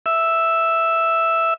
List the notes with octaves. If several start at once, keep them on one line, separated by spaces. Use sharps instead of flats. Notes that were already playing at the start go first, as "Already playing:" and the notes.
E5